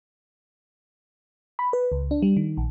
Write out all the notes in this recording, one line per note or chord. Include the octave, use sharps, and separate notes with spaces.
B5
B4
C#2
D4
G3
D#3
A#1